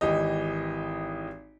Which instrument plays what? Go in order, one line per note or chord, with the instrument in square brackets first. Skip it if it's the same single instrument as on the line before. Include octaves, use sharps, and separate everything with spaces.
[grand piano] G#1 E3 G4 D#5